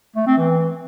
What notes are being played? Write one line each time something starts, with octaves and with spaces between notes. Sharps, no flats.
A3
C4
E3